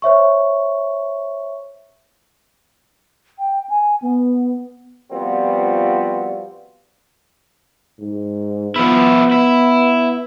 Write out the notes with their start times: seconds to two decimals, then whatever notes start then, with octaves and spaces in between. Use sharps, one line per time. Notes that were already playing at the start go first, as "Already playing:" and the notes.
0.02 C5 C#5 E5 C#6
3.38 G5
3.69 G#5
4.02 B3
5.11 F3 G3 B3 C4 F4 F#4
8.00 G#2
8.76 F3 B3 E4
9.32 E4